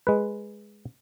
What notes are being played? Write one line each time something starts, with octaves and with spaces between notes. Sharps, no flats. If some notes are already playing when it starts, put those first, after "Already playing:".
G#3 B4